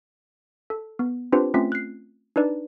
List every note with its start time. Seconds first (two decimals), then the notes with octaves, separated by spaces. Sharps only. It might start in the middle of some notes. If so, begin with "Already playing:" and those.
0.70 A4
0.99 B3
1.32 C4 D4 F4 G4 B4 C5
1.54 A3 C4 C#4 F4 B6
1.72 F#6 C7
2.36 D4 D#4 B4 D5